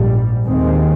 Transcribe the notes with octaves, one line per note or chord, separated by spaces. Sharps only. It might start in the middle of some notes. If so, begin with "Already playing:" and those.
Already playing: A#1 G#2 G3
D#2 D#3 G#3 C4